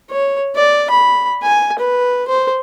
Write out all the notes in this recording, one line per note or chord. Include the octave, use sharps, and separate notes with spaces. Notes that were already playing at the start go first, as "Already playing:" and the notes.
C#5
D5
B5
G#5
B4
C5